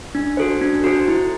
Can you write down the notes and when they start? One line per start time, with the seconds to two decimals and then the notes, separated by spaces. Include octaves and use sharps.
0.15 D4
0.37 F#4 A4 C5
0.61 D4
0.84 F#4 A4 C5
1.08 E4